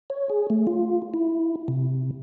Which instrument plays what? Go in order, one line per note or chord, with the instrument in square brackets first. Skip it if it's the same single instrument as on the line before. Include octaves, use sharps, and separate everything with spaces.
[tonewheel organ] C#5
G#4
A3
F4
E4
C3